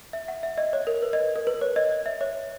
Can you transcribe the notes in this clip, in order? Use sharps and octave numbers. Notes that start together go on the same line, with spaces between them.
E5
F#5
E5
D#5
C#5
A#4
B4
D#5
A#4
B4
C#5
D#5
E5
C#5